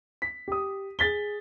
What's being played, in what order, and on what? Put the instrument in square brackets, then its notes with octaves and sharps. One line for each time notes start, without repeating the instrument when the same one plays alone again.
[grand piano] B6
G4 D#6
G#4 A6 B6 G7